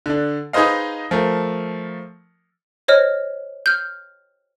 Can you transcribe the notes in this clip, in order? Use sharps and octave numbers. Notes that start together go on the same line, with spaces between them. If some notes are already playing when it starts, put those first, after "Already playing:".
D3 D4
D#4 G#4 B4 C5 D#5 F5
F3 A3 A#4
C5 C#5 D#5 F6
F6 G6